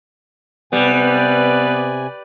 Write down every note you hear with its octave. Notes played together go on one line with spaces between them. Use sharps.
C3 G3 B3 B4 D5 G#5